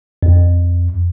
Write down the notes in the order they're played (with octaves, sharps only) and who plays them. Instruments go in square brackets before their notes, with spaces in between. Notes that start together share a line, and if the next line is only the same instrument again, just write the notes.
[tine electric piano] F2